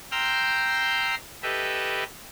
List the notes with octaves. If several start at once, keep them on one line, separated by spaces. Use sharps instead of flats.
G5 A#5 C6 E6 F6 G6
G4 A4 B4 D#5 E5